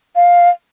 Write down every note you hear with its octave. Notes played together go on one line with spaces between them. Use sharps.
F5